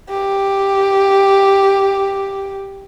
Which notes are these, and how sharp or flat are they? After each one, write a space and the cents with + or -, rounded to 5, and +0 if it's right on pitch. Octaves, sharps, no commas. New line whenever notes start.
G4 +0